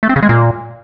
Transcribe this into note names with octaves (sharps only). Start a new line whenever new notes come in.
A3
C4
C#3
G#3
A#2